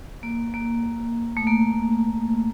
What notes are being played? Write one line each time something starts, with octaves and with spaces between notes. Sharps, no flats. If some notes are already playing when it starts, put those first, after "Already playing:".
A#3
A#3
A3
A#3